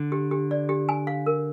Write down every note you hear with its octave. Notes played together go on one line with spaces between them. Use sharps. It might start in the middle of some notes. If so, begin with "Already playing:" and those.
Already playing: D3
G4
G4
D5
G4
G#5
F5
A#4